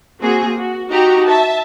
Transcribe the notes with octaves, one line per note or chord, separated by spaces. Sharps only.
A#3 C4 F#4 G#4
F#4
D#4 F#4 G4 A#5
E5 A5